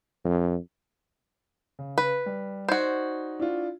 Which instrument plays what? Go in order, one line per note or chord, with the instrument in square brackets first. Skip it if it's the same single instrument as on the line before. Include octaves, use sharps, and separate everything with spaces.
[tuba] F2
[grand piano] C#3
[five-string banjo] B4
[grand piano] G3
[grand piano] D#4 D5 G#6 [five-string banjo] F#4 C5
[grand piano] D4 E4 F4